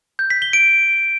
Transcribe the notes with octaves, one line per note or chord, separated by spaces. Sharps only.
G6
B6
G7
D7